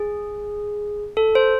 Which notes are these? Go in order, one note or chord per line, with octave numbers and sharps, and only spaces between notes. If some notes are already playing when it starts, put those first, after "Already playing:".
Already playing: G#4
A4
C5